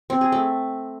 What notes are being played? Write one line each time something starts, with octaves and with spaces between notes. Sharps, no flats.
C4
G#4
A3